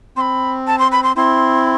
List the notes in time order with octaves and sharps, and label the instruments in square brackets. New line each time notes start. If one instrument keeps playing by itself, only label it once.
[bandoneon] C4 [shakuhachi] C6
[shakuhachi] B5
A5
C6
B5
C6
[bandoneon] C4 E4 [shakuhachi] C6